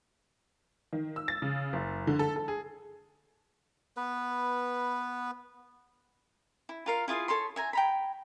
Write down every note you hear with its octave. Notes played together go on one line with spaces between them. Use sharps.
D#3
E6
A6
C#3
F#1
D3
A4
A4
G#4
B3 B4
E4
F4 A#4 F5
E4 F4 G#4 F5
A4 C#5 B5 C6
E5 G#5 A#5
G5 A#5 B5